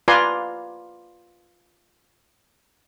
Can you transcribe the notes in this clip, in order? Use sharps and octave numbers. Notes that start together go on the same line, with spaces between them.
F4 B4 D5 G#5 A#5 C6